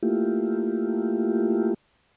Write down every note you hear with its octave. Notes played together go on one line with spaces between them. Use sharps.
A3 A#3 E4 F4 G4